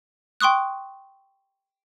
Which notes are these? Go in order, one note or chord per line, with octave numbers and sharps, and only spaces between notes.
G5 C6 C#6 D#6 F#6